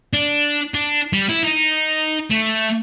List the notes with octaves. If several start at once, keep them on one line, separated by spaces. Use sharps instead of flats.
D4
D4
G3
E4
D#4
A3